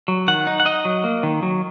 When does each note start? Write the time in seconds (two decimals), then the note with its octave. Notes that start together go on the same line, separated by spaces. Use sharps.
0.08 F#3
0.28 D#3 F#5
0.47 D#4
0.60 F#5
0.65 D#4 D#5
0.85 F#3
1.04 A#3
1.23 D#3
1.43 F#3